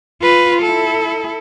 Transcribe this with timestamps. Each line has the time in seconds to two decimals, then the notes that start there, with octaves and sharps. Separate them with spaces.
0.21 F4 B4
0.62 E4 A4